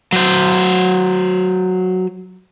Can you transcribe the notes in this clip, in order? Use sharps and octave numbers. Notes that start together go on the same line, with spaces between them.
F#3 C5